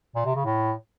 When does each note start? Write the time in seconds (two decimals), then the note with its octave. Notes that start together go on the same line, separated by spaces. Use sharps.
0.16 A#2
0.25 C3
0.35 C#3
0.45 A2